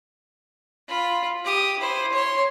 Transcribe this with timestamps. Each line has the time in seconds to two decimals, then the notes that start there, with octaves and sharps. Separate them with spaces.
0.88 F4 B5
1.44 G4 D#6
1.79 E4 C5
2.12 C#5 C6